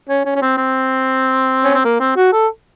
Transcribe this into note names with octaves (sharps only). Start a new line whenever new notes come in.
C#4
C#4
C#4
C4
C4
C#4
C4
A#3
C4
F#4
A4